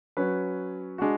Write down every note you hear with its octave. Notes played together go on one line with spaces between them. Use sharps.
F#3 C#4 F#4 B4
G#3 D4 F#4